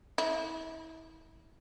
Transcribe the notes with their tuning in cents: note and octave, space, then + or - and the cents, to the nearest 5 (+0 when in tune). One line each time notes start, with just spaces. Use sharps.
E4 -35